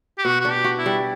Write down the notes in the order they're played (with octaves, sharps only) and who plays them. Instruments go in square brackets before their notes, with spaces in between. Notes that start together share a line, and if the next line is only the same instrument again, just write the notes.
[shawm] G4
[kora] B2 [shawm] F#4
[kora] D4 [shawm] F#4
[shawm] G4
[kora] F#4
[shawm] E4
[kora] G3